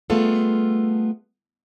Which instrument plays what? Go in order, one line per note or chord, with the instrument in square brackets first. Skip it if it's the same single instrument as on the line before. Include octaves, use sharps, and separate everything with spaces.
[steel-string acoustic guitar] G3 A3 B3 F4 G#4 A4